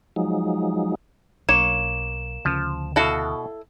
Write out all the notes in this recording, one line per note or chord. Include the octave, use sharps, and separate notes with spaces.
F3 F#3 G#3 D#4
B1 F#3 A#3 D4 C#5 E7
D2 C#3 F3 C#4
B2 E4 F#4 A4 F5